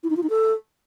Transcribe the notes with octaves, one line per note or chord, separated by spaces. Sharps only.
E4
D#4
F4
D#4
A4